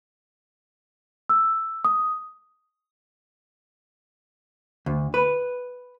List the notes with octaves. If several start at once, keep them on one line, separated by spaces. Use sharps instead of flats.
E6
D#6
D2
B4